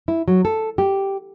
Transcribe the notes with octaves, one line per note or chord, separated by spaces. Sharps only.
E4
F#3
A4
G4